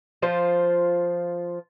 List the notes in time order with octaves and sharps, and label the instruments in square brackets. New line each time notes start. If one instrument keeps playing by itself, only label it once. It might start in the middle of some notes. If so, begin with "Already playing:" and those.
[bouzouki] F3 F4 C5